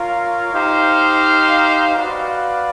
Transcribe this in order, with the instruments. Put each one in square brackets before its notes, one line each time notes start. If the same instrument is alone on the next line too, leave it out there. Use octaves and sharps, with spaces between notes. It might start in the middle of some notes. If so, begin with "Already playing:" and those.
Already playing: [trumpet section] F4 A#4 C#5 F5
D#4 G4 C5 F5
F#4 B4 D5 F5